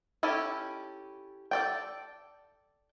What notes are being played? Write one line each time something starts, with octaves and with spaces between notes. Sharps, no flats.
C#4 E4 G4 A4 G#5
A4 D5 G5